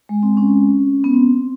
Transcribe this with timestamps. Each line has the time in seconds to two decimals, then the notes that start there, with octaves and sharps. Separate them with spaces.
0.09 G#3
0.23 C4
0.37 C#4
1.04 B3
1.14 C4